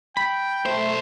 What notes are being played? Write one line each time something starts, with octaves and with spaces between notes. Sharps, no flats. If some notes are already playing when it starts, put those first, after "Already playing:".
G5 B5
B1 A3 C5